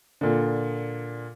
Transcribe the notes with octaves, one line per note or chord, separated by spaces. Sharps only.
A#2 D3